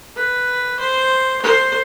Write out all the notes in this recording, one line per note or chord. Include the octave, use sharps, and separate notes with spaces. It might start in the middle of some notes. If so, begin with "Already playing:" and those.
B4
C5
C5